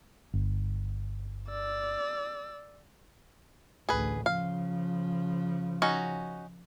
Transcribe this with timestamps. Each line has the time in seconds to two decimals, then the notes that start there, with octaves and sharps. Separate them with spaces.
0.34 G1
1.49 D5 E6
3.89 A1 D2 G#4 B4
4.26 C#3 F3 F5
5.82 C#4 D#4 F#4